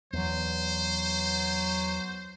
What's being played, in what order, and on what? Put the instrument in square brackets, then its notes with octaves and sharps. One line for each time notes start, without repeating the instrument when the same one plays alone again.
[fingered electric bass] E2 E3 [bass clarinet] F#3 [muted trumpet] C5